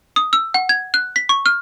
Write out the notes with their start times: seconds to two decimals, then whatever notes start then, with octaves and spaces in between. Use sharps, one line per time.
0.16 D#6
0.33 E6
0.54 F#5
0.69 G#6
0.94 F#6
1.16 B6
1.29 C#6
1.46 F6